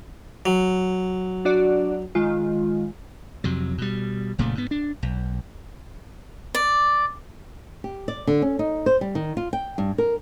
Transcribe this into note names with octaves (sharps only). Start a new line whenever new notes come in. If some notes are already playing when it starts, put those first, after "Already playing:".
F#3
D4 F#4 D5
D#3 G#3 F4
F2 C3 F#3
B2 G3
F#1 A#2 C#3 A3
G#2 B3
D4
B1
D5
G4
D5
D3
C#4
D#4
C5
G3
D#3
F4
G5
G2
A#4